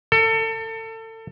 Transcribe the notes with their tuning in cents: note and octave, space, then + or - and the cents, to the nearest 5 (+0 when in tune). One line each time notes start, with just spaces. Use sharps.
A4 +30